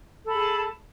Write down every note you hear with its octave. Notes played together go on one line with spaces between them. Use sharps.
G#4 A4 A5 B5